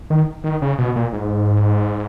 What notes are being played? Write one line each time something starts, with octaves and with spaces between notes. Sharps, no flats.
D#3
D#3
C#3
B2
A#2
G#2